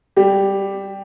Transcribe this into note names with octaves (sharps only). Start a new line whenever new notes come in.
G3 G4